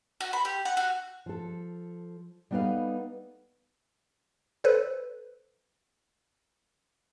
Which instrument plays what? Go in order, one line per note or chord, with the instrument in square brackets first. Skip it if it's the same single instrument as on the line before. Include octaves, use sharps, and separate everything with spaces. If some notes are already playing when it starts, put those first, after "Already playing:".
[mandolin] F#4
B5
G4
F#5
F#4
[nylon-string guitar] F3 A4
G3 B3 D#4 A4 B4 F5
[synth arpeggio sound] A4 B4 C5